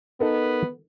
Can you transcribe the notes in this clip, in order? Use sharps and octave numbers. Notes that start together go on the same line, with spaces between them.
B3 D#4 A4 A#4